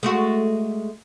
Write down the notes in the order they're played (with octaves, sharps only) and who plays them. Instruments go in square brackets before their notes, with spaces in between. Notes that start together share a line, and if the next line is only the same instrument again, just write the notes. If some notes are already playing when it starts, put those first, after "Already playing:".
[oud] G#3 A3 F#4